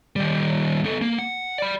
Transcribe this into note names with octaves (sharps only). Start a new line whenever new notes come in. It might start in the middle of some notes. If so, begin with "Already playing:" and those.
D#3 G3
B3 A4
A#3
F#5
D5 B5